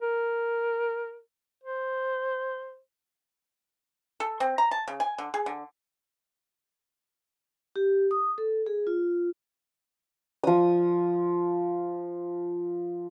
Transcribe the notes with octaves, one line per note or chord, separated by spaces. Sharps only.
A#4
C5
A4
C4
A#5
A5
C#3
G#5
D3
G#4
D3
G4
D#6
A4
G#4
F4
F3 D#6